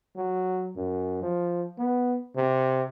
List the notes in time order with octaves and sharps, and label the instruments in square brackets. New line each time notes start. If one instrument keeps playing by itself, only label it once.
[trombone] F#3
F#2
F3
B3
C3